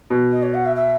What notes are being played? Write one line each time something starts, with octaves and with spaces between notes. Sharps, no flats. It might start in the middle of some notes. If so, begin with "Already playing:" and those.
B2
D#5
C#5
F#5
E5
E5